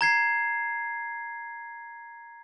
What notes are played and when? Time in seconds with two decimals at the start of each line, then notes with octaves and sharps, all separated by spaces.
0.01 A#5 G#6 C7